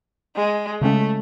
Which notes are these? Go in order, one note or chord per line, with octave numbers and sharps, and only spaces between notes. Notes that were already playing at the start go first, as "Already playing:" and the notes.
G#3
C#3 G#3 A3 C#4